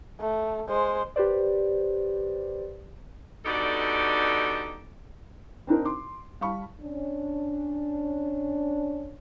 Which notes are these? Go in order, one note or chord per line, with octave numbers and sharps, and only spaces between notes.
A3
G#3 C5
G4 B4 C5 D5
B2 D3 D#4 G4 A4 D5
C4 D4 D#4 A#4
C6 D6
G3 F5 A5 B5 C#6
C#4 D4